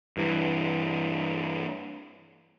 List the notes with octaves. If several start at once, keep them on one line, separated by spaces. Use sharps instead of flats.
G2 E3